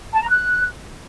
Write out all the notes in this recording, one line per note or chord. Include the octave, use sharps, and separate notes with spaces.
A5
A#5
F#6